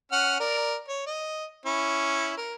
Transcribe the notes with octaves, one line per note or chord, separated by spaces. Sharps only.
C#4 F#5 F6
A#4 D5
C#5
D#5
C#4 E4
A#4